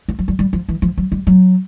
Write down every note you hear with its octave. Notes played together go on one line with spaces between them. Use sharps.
B3
F#3
G3
G3
F3
E3
F3
F#3
G3
F#3